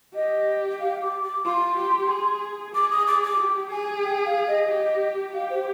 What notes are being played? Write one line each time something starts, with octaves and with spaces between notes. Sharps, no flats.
G4 D#5
F5
D6
D6
F4 C6
G4
G#4
G#4 D6
D#6
D6
D6
G4
G#4 G#5
G5
F5
D#5
G4
G4 F5
C5